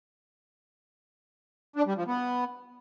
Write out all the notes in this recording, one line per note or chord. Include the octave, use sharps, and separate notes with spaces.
D4
G3
F3
B3